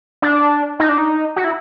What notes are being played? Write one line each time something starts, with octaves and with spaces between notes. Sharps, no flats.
D4
D#4
D4
D#4
F#4
E4